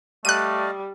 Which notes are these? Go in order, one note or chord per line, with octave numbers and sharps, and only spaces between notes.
G3 A3 D5 D#5 F5 F#6 D#7